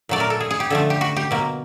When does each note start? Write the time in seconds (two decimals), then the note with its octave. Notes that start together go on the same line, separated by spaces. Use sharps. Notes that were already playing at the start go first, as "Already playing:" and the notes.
0.09 A#2 F#3 A3 D5
0.20 A#4
0.30 A4
0.40 G#4
0.51 G#4
0.60 G4
0.70 D3 F3 A3 A4
0.90 G4
1.01 F#4
1.16 G4
1.31 B2 F#3 A#3